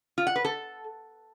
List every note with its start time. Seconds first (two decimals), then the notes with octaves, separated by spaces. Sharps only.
0.18 F4
0.27 F#5
0.36 B4
0.45 A4